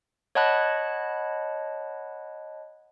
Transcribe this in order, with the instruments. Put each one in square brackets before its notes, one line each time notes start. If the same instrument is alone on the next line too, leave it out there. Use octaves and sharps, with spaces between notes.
[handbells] C#5 D#5 F#5 A5 B5 F#6